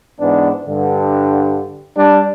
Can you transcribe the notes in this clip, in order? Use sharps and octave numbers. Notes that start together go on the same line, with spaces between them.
G#2 E3 B3 D4
G2 D3
G3 D4